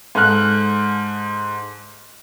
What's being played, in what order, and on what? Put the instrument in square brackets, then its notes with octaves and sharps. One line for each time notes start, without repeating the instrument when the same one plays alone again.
[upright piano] G#2 A4 F6 F#6